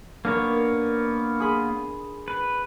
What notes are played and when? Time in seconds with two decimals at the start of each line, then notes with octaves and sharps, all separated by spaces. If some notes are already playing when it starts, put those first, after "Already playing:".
0.25 A#3 B3 D4 A#4 C#5
1.40 G#4 B5 C6
2.28 B4